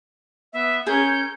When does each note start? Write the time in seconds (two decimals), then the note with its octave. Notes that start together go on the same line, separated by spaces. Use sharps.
0.53 B3 E5
0.86 C#4 G#4 A#4 G6